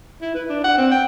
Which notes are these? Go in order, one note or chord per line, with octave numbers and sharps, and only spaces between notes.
E4
B4
D4
F#5
C4
G5